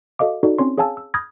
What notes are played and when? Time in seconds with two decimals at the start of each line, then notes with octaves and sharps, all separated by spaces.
0.19 F#4 A4 D#5 F5 D6
0.43 D#4 F#4 A4 D5
0.58 C4 C#4 C#5 C6
0.78 G#4 C#5 F5 G#5 A5 E6
0.97 E6
1.14 B5 D#6 F6 G6 G#6 A#6